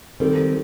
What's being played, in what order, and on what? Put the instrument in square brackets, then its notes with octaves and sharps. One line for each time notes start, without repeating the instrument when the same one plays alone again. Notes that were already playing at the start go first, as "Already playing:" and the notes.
[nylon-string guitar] D#3 G3 C4 [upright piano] A4